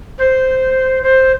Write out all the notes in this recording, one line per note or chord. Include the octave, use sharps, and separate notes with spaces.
C5
C5